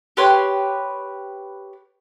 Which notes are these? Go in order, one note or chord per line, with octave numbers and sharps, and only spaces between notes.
G4 B4 C#5 C6